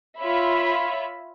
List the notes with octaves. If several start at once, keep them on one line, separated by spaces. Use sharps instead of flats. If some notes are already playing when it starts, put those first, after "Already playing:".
F4 C#5 E5 B5